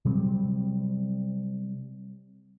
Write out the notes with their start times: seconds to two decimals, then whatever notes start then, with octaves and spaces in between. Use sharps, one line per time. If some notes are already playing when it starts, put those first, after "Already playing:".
0.05 C3 F#3 G3 C4